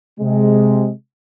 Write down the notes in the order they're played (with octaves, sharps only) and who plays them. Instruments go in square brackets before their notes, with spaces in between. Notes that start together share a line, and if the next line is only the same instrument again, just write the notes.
[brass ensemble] C3 G#3